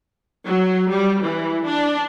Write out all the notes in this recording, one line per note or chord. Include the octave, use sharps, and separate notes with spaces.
F#3
G3
E3
D4